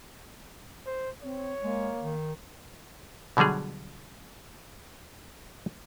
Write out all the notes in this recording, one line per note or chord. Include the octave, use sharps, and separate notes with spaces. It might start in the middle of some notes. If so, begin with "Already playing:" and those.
C5
C4 C#5
G#3 A#3
D#3
B2 D3 F#3 G3 G#4